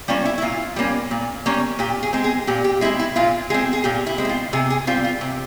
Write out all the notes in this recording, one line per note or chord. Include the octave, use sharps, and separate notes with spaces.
G3 A#3 C#4 F4
E4
E4
A#2 F4
G3 A#3 C#4
A#2
G3 A#3 C#4
A#2 G4
G#4
G#3 C4
G#4
A#2 G4
G4
G#3 C4 E4
E4
A#2 F4
G#3 C4 G#4
G#4
A#2 G4
E4
G#3 C4
E4
F4
C3 G#4
G#4
G3 C4 F4
F4
C3